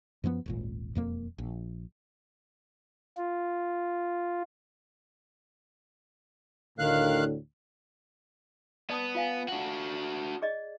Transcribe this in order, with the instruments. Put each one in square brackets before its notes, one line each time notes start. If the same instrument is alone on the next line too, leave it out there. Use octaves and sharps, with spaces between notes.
[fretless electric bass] F#2 F3 A3 B3
D#1 G#1 A#2
E1 F2 A#3
A#1
[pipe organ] F4
[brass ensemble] D2 A2 D3 [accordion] D#3 F5 F#6
[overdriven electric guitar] B3 [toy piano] D5 A5 D#6
[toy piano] F4 F5 G#5
[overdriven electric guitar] D4 F#4
[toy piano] G#4 D5 D#5